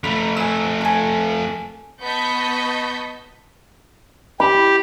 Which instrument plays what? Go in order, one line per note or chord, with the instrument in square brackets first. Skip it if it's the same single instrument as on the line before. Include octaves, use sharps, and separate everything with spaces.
[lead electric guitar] F2 A3 [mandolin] A#5 B5
[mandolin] G#5 E6
A4 G#5
[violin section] B3 D#5 A5 C#6 G6 B6
[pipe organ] G4 [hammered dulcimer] B5